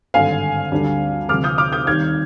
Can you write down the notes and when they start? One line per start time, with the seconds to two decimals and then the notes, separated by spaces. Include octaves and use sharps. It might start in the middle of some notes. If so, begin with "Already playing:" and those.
0.14 G#1 G2 D3 F5 G#5
0.72 D2 D3 G3 D4
1.29 D2 C3 F3 D6 F6
1.44 D#6 G6
1.58 D6 F6
1.73 D#6 G6
1.87 D#2 D#3 G3 C4 F6 G#6